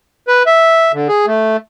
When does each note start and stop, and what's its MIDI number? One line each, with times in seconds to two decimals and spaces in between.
0.28 0.43 71
0.46 0.92 76
0.93 1.08 50
1.08 1.26 68
1.27 1.57 57